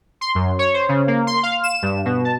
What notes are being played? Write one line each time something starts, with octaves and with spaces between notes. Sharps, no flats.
C6
F#2
C#5
C5
C#3
A#3
C6
F5
E7
G2
B2
A5